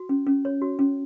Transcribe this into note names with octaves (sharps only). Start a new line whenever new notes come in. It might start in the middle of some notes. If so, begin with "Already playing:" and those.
Already playing: F#4
C#4
C#4
C#5
F#4
C#4